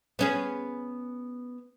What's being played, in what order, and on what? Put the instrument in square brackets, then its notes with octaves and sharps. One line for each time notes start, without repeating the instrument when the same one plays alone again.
[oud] B3 C#4 G#4